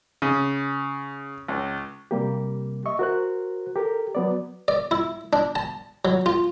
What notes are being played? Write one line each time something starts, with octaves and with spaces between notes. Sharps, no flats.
C#3
C#2
C3 G3 A#3 G4
D#5 E5 C#6
F#4 A#4 C5 F#6
G4 A4 A#4
F#3 B3 D5
D5
E4
D4
A5
F#3
F4